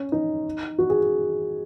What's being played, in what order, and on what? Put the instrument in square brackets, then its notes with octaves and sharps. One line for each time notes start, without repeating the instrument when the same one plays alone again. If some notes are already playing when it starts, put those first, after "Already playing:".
Already playing: [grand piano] C#4
D#4
F#4
G#4